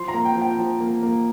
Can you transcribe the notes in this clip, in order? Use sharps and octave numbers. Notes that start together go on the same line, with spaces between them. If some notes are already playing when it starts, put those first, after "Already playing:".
Already playing: F3 C6
A#5
A#3
G5
F3
G5
F3
A#3
A#3